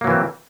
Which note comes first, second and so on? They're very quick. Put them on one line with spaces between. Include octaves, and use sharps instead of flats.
A#3 F#3 E3 C4